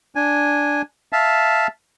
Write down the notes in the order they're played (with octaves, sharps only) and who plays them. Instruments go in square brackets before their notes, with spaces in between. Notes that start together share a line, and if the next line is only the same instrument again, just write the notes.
[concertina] D4 G#5
E5 F5 A5